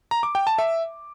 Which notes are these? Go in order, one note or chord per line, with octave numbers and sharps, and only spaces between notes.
A#5
D6
G5
A5
E5